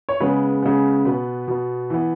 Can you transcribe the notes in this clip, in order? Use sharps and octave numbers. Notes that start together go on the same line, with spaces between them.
C#5
C#3 G#3 B3 B4
C#3 G#3 B3
B2 B3 B4
B2 B3
E3 B3